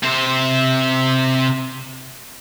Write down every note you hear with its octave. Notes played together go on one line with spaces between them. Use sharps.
C3 C5